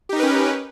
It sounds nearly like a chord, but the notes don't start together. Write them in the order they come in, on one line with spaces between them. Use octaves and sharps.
G4 D#4 A#4 B4 C#4